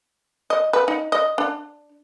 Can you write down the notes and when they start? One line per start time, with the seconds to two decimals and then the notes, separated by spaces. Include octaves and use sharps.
0.50 D#5
0.73 B4
0.88 D#4
1.12 D#5
1.38 D4